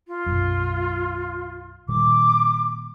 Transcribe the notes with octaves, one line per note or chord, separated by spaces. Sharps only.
F4
B1 F#2
A#2 D#3 G3 D6